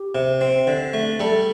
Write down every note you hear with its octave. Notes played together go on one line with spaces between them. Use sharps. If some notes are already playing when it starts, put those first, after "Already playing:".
Already playing: G4
C3
C4
D3
A3
G3 A4